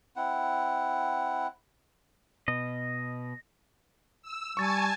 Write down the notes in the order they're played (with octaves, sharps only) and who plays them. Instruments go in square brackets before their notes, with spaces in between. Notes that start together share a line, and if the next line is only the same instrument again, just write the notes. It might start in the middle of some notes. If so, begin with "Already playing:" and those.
[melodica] C4 E4 F#5
[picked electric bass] B2 [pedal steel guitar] D#5
[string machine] E6
[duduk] G3 [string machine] G#5 A5 G#6 [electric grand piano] C#6 A6